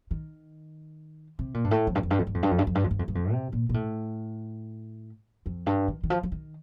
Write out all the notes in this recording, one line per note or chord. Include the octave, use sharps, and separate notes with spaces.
D#3
C3
A#2
G2
A2
F2
G2
F2
G2
F2
G2
F2
G2
F2
G2
F2
G2
F2
G2
F2
G2
F2
C3
A#2
A#2
A2
F2
G2
D#3
D#3
F3
F3
D#3